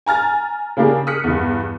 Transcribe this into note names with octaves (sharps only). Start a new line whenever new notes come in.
G#5 A#5 F6 A6
C#3 A#3 D4 G4 G#4 A#4
D#6 F6 F#6 B6 C#7
E2 G2